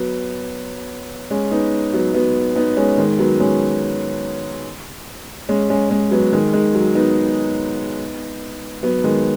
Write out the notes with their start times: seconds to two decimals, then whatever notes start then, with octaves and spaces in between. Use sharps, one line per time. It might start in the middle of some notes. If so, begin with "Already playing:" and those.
Already playing: F#3 B3
1.31 G#3 C#4
1.51 B3 D#4
1.93 F#3 B3
2.14 F#3 B3
2.56 B3 D#4
2.77 G#3 C#4
2.98 D#3 G#3
3.19 F#3 B3
3.40 G#3 C#4
5.49 G#3 C#4
5.70 G#3 C#4
5.90 G#3 C#4
6.11 F#3 B3
6.33 D#3 G#3
6.53 D#3 G#3
6.75 F#3
6.95 B3 D#4
8.83 F#3 B3
9.04 D#3 G#3